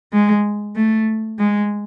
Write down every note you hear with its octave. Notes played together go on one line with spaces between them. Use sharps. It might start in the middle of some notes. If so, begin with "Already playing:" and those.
G#3
A3
G#3